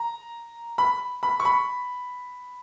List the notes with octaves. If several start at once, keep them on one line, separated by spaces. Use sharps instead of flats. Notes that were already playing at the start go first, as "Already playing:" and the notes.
Already playing: A#5
B5
B5
C#6
B5